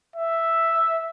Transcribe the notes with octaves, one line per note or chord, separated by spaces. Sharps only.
E5